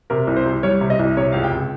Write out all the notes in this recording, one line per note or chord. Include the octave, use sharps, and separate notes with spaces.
C3 A#4
C2
C5
C2
G3 C#5
C3
D#5
C2
C3 C#5
C#2 F5
G5
C#2